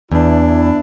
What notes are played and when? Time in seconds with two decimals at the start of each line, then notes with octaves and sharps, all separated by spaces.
0.12 E2 D4 E4